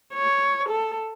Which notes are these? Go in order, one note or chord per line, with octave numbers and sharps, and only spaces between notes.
C#5
A4